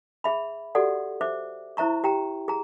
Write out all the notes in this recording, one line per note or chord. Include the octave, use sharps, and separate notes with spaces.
G#4 E5 B5
F#4 G4 A4 D5 F#5
C5 E5 D6
E4 C5 E5 A#5 C#6
G4 G5 A#5
G#4 A#5